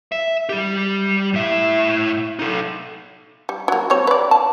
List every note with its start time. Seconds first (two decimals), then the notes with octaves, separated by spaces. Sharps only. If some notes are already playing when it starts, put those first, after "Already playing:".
0.12 E5
0.49 G3 G4
1.33 A2 E5
2.39 D#4 A4
3.49 G3
3.68 F#3 A#3
3.90 G3 C4 C#5
4.07 B4 D5
4.31 A5